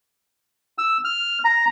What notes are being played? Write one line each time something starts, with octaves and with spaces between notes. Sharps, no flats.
E6
F6
A#5